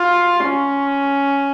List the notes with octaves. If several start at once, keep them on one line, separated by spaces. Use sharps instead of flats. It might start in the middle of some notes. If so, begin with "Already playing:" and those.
Already playing: F4
C#4